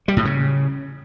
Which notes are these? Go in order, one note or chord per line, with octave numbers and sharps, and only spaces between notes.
G3
A2
C#3